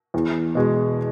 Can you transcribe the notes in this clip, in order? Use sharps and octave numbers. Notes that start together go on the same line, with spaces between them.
E2
B2 G#3